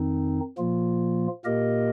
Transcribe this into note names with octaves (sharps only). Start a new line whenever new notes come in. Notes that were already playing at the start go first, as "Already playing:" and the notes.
Already playing: F2 D#3 C4 D#4
A#2 F3 A#3 F4
A#2 A#3 G4 A#4 D#5